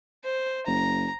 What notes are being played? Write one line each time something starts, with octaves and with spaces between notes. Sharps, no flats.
C5
F#1 A#5